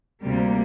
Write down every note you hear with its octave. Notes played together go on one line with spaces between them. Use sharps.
D2 C3 G3 A#3